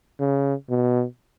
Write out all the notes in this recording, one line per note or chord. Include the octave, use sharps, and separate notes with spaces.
C#3
B2